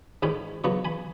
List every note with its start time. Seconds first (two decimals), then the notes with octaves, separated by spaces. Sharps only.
0.22 G#2 D#3 G#3 C#4 G#5 B5
0.64 C#3 F#3 B3 A#5 C#6
0.85 G#5 B5